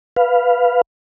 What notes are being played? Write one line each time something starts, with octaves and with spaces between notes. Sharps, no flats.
B4 F5